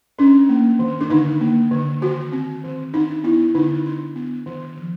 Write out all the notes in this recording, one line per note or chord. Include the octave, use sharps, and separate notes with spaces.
C#4 D4
A#3
D#3
D4
D3 D#4
A#3
D3
D#3 F#4
C4
D#3
D4 D#4
B3 E4
D3 D#4
D4
B3
D#3
F3